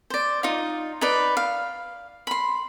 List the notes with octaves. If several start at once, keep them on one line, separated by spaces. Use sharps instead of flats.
C5 D5
D#4 F4
D#4 B4 D5
F5
B5 C6